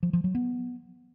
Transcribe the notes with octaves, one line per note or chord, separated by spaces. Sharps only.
F3
F3
F#3
B3